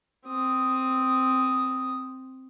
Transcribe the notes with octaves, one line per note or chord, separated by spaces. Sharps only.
C4 D#6